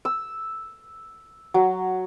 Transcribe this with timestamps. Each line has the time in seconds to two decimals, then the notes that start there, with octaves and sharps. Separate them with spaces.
0.05 E6
1.54 F#3